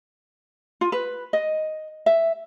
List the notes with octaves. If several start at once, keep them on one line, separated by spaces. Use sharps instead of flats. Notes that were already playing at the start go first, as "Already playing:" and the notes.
F4
B4
D#5
E5